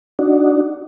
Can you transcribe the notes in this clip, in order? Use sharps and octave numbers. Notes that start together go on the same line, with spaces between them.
D4 D#4 F#4